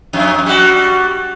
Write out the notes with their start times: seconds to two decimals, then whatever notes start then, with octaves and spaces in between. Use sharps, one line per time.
0.13 F2
0.46 G3 F#4